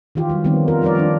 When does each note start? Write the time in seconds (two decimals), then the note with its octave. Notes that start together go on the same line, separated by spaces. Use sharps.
0.15 D#3 E3 F4 G4
0.29 F#3 G3
0.44 D#3 F3 G3 B3 C4
0.68 F4 A#4
0.82 F3 G3 A#4 C#5 D5
0.95 D#3 G3 D4